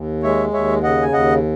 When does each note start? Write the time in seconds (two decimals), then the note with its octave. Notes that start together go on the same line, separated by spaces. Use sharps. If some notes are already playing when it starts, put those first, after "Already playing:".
Already playing: D#2
0.23 G#3 C#5 E5
0.53 D#2 C#5 E5
0.83 C#3 D#5 F#5
1.03 G#5
1.12 D#2 D#5 F#5